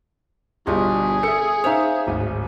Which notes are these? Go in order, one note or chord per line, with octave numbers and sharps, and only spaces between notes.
G1 G2 B2 F4 F#4 G#4 D#5
A4 E5 C#7
D#4 C5 C#5 E5 F5
D1 G#1